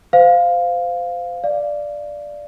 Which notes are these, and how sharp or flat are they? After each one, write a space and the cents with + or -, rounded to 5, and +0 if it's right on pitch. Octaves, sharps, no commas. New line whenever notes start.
C5 -25 F5 +0
D5 +0 F5 -20